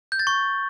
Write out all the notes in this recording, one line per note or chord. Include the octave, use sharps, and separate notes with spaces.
G6
A6
C#6